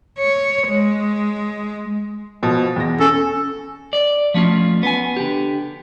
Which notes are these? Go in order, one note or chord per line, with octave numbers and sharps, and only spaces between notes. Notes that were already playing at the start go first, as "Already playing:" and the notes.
C#5
G#3
B2 F3
E2 A#6
C#4 A4
D5
F3 A3 C#4 F4
B3 G#5
D3 G4